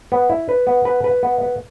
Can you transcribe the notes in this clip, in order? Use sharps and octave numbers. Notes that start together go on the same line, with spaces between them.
B3
E4
B4
B3
B4
B4
B3
B3